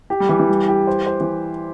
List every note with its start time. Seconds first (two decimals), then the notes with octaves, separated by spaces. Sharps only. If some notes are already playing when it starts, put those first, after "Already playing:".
0.10 G4
0.20 G3
0.29 E3 G4
0.40 E3
0.49 G3
0.68 G4
0.87 C5
1.06 C5
1.21 E3